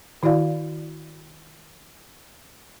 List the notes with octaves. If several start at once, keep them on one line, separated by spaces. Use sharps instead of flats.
D#3 E4 F#4 D5 F5